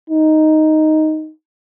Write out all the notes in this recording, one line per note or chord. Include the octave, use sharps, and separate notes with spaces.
D#4